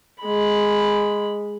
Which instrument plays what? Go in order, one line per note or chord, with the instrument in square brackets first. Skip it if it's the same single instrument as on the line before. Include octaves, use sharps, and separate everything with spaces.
[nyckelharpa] G#3 B5